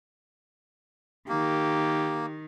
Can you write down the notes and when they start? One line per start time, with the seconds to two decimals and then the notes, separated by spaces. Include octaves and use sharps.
1.28 D#3 A#3 G4